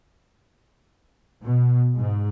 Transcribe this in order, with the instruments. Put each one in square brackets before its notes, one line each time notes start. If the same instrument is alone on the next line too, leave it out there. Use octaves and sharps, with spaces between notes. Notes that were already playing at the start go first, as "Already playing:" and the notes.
[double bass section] B2
G#2